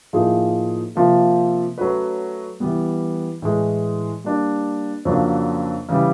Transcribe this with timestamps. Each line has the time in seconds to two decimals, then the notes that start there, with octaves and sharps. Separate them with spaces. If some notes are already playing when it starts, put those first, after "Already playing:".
0.13 A2 F3 A#3 D#4 G#4
0.96 C3 F3 A#3
1.78 F#3 A3 C#4 F#4 B4
2.60 E3 G3 B3
3.42 A2 E3 G#3
4.24 G3 A#3 D4
5.05 F2 C#3 F#3 A#3 D4
5.89 C#3 E3 G3